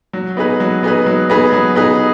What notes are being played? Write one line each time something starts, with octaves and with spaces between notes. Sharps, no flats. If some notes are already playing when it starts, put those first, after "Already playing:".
F#3
B3 D#4 G#4 B4
F#3
B3 D#4 G#4 B4
F#3
B3 D#4 G#4 B4
F#3
B3 D#4 G#4 B4